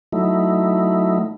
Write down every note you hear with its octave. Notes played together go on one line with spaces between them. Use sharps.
F#3 A3 D#4 E4